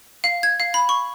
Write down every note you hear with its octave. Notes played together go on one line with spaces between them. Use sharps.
F5
G#6
F5
B5
C#6